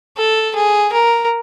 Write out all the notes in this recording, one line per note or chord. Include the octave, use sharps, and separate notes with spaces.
A4
G#4
A#4